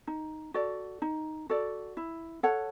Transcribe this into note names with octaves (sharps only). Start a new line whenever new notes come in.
D#4
F#4 A4 D5
D#4
F#4 A4 D5
E4
A4 C#5 F#5